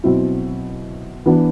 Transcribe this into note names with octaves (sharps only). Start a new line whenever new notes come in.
B2 F#3 C4 E4
E3 B3 D4